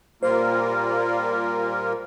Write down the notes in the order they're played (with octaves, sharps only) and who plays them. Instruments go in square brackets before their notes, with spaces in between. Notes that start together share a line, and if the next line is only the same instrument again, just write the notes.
[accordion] A#2 G3 A#3 F4 A#4 [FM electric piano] C5